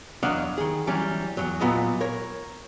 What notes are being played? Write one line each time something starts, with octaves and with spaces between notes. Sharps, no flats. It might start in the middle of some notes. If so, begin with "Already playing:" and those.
E2 F#3 D4 D#5 F5 F#5
D#3 G#4
E3 F#3 G3 C#4
E2 G#2 F#3
A#2 F#3 B3 F4 D#5
A#4 C#5